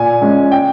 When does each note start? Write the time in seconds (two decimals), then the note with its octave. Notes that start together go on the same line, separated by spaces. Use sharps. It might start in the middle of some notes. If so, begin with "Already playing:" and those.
Already playing: A#2 G#5
0.22 G#3 C#4
0.52 G5